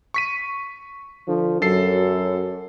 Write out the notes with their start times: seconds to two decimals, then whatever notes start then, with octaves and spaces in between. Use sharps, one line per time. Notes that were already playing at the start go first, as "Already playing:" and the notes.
0.14 C#6 B6 D#7
1.28 D3 F3
1.62 F#2 F#3 A4 C7